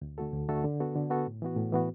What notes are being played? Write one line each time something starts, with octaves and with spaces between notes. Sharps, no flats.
D2
D3 A3 F#4 A4
D2
D3 A3 F#4 A4
D3
B3 F#4 A4
D3
B3 F#4 A4
A2
E3 B3 F#4
A2
E3 B3 F#4